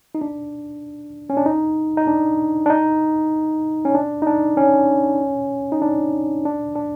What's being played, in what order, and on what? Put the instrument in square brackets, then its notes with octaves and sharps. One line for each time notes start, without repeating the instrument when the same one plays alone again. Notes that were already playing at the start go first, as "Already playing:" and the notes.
[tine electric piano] D#4
D4
C#4
D4
D#4
D#4
D4
D4
D#4
C#4
D4
D#4
D4
C#4
D#4
D4
D4
D4